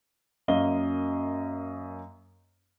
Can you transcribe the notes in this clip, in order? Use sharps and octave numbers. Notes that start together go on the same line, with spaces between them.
F#2 A#3 D#5 F5 G7